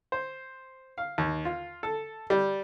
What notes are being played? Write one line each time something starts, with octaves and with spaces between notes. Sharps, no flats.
C5
F5
D#2
F4
A4
G3